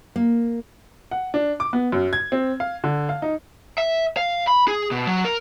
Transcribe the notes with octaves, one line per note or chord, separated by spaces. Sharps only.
A#3
F#5
D4
D6
B3
F#2
G#6
C4
F5
D3
F5
D#4
E5
F5
B5
G#4
B2
F#3
A#4